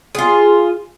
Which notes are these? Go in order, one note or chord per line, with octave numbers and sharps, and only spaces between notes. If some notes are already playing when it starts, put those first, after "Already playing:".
F4 G#4